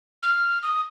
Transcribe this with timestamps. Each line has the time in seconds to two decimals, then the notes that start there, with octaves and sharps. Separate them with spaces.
0.23 F6
0.63 D#6